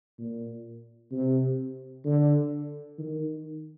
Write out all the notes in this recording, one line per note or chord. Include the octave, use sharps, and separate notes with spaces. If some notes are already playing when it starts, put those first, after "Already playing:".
A#2
C3
D3
D#3